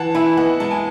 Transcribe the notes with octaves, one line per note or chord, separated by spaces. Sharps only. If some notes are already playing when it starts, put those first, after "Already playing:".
Already playing: E3 F#5 A5
E4 E5 G#5
B3 D#5 F#5
G#3 A5
G#5